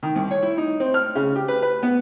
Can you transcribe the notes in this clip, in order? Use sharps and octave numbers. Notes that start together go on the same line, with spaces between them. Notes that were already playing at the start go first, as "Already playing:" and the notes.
D#3
C2
C#5
E4
D#4
C4
F6
C#3
G4
B4
B4
B3